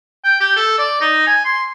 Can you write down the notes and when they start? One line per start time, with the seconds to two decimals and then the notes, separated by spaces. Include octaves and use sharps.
0.24 G5
0.41 G4
0.57 A4
0.79 D5
1.01 D#4
1.27 G#5
1.45 C6